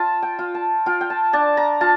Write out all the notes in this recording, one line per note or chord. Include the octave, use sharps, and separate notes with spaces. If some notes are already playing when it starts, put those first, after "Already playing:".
Already playing: F4 A5
G5
F4
A5
F4 G5
G5
A5
D4 A5
A#5
F4 A5